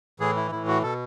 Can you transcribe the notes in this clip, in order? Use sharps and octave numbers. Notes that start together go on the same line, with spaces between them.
A2 E3 G#4
E4
A2 E3 E4
F#4
B2 A4